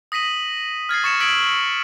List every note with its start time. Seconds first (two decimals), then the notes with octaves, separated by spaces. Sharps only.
0.12 D#6 A#6 B6 D#7 F#7
0.89 F6 G#6 A6 C7
1.04 C#6 A6 C#7 E7
1.20 D#6 E6 G#6 B6 D7 F#7